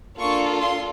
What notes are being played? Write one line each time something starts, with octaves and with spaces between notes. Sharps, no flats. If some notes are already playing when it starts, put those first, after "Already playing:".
A#3 D4 F4 A4 C#6
C6